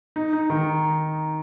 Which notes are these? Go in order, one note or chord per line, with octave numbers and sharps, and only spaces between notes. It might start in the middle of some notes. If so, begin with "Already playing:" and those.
D#4
D#4
D#3